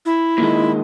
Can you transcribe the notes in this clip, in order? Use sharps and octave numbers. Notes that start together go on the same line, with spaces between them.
E4
A#2 D#3 G#3